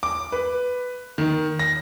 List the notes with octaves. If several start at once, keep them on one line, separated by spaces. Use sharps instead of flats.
D6
B4
D#3
A#6